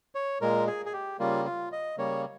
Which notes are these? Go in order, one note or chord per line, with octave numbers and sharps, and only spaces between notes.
C#5
A#2 G#3 A#4
G#4
G#4
G4
C#3 G3 A#3 F4
F4
D#5
C#3 G3 A#3 C#5